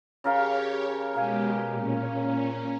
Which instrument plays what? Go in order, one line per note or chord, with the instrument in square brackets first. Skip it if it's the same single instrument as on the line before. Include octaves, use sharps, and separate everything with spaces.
[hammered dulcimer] C#3 A#4 F5 [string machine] G4 C#5
[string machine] B2 G#3 G4 [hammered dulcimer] A#4 F5 G#5
[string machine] A#2 C#4